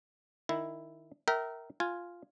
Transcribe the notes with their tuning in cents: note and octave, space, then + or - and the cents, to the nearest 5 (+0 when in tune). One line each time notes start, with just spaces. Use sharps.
D#3 -10 E4 +0
A#4 -5 E5 -15 G5 -30
F4 +0 G#5 +0